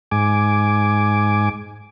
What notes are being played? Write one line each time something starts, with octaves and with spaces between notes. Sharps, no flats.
G#2 G#5 D6